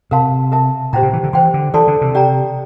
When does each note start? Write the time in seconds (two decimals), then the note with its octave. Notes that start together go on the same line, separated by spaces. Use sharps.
0.11 C3 A#4 F5 A5 C6
0.52 A#4 E5 A5
0.93 A#2 G4 C5 G5 A#5
1.03 C3
1.13 E3
1.23 D3
1.33 E3 C5 G5 C6
1.54 D3
1.74 E3 A4 D5 A5 C6
1.88 D3
2.01 C3
2.15 G4 D5 G5 A#5